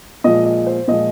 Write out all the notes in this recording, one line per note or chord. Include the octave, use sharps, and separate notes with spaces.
A#2 F3 G#3 D#5
D#5
C5
A#2 F3 G#3 D#5